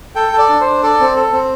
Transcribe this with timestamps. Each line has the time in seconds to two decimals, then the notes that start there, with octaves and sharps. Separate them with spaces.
0.16 A4 G5
0.33 A4
0.38 D5
0.49 D4
0.61 C5
0.66 D4
0.83 A4 D5
1.00 C4
1.16 A4
1.33 C4